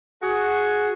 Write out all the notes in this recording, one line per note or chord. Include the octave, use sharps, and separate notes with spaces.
F#4 G#4